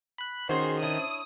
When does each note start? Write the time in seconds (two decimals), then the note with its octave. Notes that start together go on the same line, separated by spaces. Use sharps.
0.18 B5 F#6
0.49 D#3 C#4 F#4 G#4 C5 C6
0.82 D4 E4 C#5 D#6